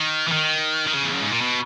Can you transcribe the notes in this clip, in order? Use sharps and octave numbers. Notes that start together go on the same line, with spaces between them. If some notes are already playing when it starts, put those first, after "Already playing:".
Already playing: D#3
E3
D#3
D#3
C#3
E2
F#2
G#2
A#2
B2